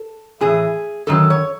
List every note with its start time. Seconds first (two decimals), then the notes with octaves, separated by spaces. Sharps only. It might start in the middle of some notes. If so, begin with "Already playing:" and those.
Already playing: A4
0.41 A2 E3 G#4
1.07 F#2 D#3 F#3 A4
1.30 C#5